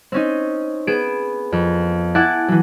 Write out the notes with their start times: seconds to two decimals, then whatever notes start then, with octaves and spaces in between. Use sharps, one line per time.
0.12 C4 C#4 D#4
0.87 B3 G#4 D7 E7
1.52 F2
2.15 E4 F#5 G#5 A5 D6
2.48 E3 F#3